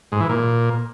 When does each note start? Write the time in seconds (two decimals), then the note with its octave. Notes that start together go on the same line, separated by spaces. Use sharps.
0.12 G#2
0.21 E3
0.29 A#2